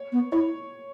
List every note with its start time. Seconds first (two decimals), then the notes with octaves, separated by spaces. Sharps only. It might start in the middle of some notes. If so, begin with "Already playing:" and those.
Already playing: C#5
0.12 B3
0.32 E4 C#5